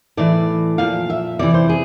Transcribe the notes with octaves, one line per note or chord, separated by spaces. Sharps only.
A2 E3 D5
A#2 F3 F5
E5
C3 E3 D5
C5
G#4